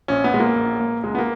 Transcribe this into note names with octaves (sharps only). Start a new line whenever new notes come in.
A#1 C#4
B3
A#2 G#3
A#3
A#1
A#2
C#2 G#3
B3
A#3